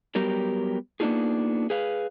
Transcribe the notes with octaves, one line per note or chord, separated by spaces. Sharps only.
F#3 G3 B3 G4 A#4
A#3 B3 D4 D#4 F4 G#4
G#4 B4 F5